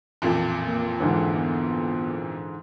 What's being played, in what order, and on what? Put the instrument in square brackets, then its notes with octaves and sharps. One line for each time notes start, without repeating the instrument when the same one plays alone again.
[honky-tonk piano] A1 F2 A#2
[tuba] A#3
[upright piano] G#2 D3 E3
[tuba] B3